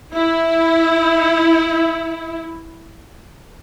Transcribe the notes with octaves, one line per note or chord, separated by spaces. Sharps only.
E4